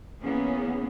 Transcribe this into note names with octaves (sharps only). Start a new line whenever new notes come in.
E3 A#3 B3 C#4 G#4